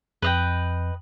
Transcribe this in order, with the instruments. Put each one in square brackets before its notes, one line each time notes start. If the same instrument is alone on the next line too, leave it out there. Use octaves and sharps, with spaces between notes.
[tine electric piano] F2 [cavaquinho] B4 D#5 G5